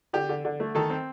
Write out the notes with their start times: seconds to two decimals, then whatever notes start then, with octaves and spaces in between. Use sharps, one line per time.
0.13 D3 G4
0.29 D3
0.45 D3
0.60 A3
0.75 D#3 A4
0.90 C4